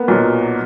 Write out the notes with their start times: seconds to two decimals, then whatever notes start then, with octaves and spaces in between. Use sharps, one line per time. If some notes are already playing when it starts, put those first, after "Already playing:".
Already playing: A#3 B3
0.08 B1 A#2 F#3